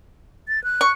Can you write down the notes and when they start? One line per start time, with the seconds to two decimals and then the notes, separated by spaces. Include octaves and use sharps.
0.48 A6
0.64 F#6
0.81 C#6